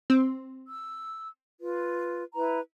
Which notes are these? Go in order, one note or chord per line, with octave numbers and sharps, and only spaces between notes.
C4
E6
F4 B4
E4 B4 A#5